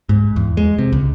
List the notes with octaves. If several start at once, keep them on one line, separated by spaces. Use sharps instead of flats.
G#2
E2
G#3
C3
C#2